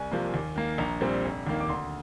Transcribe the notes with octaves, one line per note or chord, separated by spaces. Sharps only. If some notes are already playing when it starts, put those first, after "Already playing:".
Already playing: C2 G#5
C3 F3 A#3
D#2
D#3 A#3
A#1 A#5
A#2 G3 C4
F1
D#2 D#3 A#3
D6
D2 C6